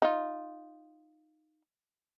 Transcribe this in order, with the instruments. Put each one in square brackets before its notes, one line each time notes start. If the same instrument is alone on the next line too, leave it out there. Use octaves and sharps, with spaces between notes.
[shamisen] D#4 F4